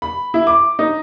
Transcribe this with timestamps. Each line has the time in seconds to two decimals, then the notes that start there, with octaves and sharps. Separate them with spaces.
0.02 B5
0.34 E4
0.47 D6
0.79 D#4